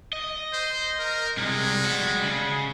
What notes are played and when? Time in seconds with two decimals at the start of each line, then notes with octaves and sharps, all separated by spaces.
0.13 D#5
0.53 C5
0.99 A#4
1.37 C3 G3 G#3
1.85 G3 F#4
2.22 C#3